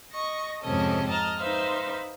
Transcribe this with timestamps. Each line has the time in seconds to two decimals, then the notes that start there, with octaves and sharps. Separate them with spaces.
0.13 D#5 C#6 A#6
0.62 F2 G#2 C3 C#4 A4 D#5
1.08 D#5 A5 A#5 F6
1.39 D#4 B4 C5 E5 F5